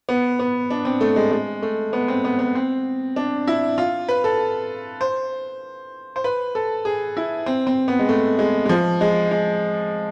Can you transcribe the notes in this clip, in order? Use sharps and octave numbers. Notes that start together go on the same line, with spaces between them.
B3
B3
D4
C4
A3
G#3
G#3
A3
B3
C4
B3
B3
C4
D4
E4
F4
B4
A4
C5
C5
B4
A4
G#4
E4
C4
C4
B3
G#3
A3
G#3
G#3
F3
G#3
G#3